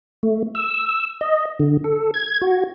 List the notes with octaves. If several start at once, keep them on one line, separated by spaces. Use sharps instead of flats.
A3
E6
D#5
D3
A4
G#6
F#4